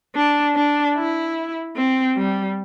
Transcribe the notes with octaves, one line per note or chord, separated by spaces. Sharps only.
D4
D4
E4
C4
G3